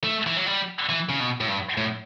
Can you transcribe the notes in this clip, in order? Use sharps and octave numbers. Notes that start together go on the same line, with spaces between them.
A3
E3
F#3
G3
E3
C#3
B2
A2
G2
A2